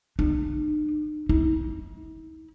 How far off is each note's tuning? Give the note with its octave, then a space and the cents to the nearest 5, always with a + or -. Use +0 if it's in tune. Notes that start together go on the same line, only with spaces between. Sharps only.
D#4 -45
D#4 +45